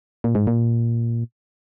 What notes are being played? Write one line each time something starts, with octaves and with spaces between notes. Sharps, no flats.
A#2
G#2
A#2